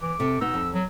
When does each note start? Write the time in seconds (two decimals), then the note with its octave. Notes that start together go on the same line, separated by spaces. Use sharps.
0.02 E3 D6
0.20 C3 A4
0.41 B2 B3 D#4 E6
0.54 F2
0.74 F#3